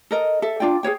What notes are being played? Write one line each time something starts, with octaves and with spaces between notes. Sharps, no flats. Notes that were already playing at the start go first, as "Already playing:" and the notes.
A4 A#4 D#5
A4 E5
D4 F4 D5 G5
G#4 B4 C#5 G5